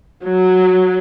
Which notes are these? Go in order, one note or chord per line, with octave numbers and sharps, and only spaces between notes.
F#3